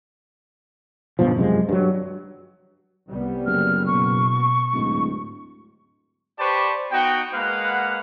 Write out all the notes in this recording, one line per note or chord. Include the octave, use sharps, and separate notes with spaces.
G2 B2 D3 F3
F#2 C3 F3 G#3
G2 F#3
C2 G3 B3
F#1 F6
B2 C#6
D1 G#2
G4 B4 C5 D5 A5 C#6
B3 D#4 F#4 G5
G#3 A#3 B4 F5 F#5